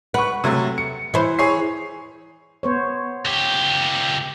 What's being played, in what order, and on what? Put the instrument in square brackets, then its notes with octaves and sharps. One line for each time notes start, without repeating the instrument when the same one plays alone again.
[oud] B4 [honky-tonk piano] F#5 C#6
[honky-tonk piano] C3 F#3 A3
C#7
[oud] E3 C5
[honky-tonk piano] G#4 C#5 C7
[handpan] B3 C5 C#5
[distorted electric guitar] C#2 G4